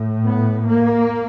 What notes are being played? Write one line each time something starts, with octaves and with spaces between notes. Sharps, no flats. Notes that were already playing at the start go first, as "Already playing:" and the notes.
Already playing: A2
B3
A#3